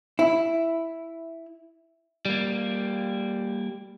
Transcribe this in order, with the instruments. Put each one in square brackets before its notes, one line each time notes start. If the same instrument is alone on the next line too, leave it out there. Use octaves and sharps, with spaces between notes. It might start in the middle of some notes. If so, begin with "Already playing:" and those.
[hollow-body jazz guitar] E4
[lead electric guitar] G3 A#3